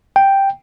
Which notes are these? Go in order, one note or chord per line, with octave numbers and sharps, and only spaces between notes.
G5